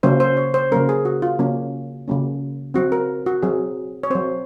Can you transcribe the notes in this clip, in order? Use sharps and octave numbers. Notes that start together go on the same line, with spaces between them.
C#3 F#3 A#3 C#4 C5
C5
C#5
C5
C#3 F#3 A#3 C#4 A#4
G#4
F#4
F4
C#3 F#3 A#3 C#4
C#3 F#3 A#3 C#4
F#3 C4 F#4
A#4
F#4
F#3 C4 G#4
C#5
F#3 C4 C5